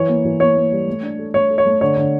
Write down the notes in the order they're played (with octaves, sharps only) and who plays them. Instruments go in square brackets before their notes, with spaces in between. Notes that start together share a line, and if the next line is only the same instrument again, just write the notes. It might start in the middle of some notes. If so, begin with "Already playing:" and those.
Already playing: [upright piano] E3 [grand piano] C#5
[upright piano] A#3
E3
[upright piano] A#3 [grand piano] C#5
[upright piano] A#3
G3
A3
D4
A4
[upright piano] A3 [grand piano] C#5
[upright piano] A4
[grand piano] C#5
[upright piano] A3
[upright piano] D3 [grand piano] C#5
[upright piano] D3